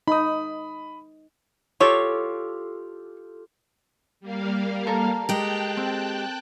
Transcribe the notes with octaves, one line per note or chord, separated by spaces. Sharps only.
D#4 B5 D#6
F4 G4 A4 C#5
G3 A#3 F5
A4 A#4
G#3 G4 G5 A5 F#6
C4